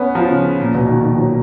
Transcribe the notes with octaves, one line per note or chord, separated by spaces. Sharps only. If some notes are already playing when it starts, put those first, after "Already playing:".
Already playing: B3 C#4
F3
C#3
A#2
B2
D#3
D#3
F3
F#3